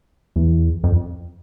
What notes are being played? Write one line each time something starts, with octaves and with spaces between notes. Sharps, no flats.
E2
F2